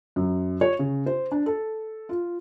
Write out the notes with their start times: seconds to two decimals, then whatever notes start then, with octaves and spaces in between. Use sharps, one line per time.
0.16 F#2
0.61 C#5
0.79 C#3
1.06 C5
1.32 D4
1.46 A4
2.09 F4